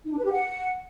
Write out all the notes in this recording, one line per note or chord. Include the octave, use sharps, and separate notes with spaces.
D#4
D4
B4
G4
F#5